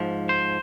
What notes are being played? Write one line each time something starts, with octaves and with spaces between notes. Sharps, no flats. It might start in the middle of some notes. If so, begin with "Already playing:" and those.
Already playing: G#2 F3
C5